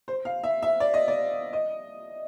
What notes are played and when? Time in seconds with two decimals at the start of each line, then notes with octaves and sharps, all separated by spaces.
0.08 C5
0.25 F5
0.44 E5
0.63 E5
0.80 D5
0.94 D#5
1.08 D5
1.53 D#5